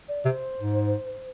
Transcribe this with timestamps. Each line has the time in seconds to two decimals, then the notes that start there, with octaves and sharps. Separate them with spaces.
0.08 D5
0.25 C3 C5
0.59 G#2